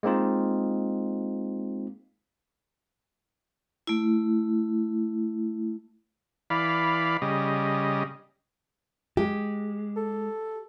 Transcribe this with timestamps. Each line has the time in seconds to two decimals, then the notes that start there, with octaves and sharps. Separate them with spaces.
0.03 G#3 A#3 C4 D#4 F4
3.87 A3 E4
6.50 E3 D5 F5 B5
7.22 C#3 G3 D#5
9.17 G#3 G4
9.96 A4